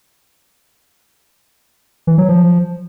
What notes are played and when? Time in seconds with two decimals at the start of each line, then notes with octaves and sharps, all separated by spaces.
2.07 E3
2.18 F#3
2.29 F3